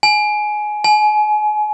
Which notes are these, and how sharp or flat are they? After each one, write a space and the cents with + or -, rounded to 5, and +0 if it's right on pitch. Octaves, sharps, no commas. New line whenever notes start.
G#5 +20
G#5 +35